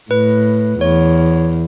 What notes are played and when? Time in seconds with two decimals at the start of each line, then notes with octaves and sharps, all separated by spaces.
0.10 A2 B4
0.81 E2 C#5